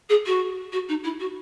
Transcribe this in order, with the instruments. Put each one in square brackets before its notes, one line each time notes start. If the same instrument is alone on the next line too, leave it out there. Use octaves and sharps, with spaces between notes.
[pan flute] G#4
F#4
F#4
D#4
E4
F#4